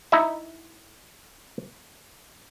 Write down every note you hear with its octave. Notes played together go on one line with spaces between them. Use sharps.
D#4 E4 E5